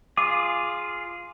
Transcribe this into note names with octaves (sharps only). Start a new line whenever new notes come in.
F4 G#4 D6